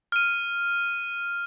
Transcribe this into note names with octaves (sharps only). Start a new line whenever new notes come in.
F6 D#7